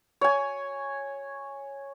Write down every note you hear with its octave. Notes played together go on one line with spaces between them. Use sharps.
C#5 G#5